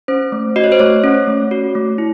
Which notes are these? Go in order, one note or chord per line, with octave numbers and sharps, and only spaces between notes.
C#4 C5
A3
F#4 D#5
C#5
C5
A3 C#5
C#4
A3
F#4
A3
E4